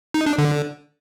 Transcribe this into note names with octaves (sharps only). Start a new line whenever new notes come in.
D#4
D4
D3